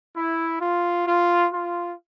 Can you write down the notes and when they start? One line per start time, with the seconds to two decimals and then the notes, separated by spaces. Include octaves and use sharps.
0.15 E4
0.60 F4
1.06 F4
1.52 F4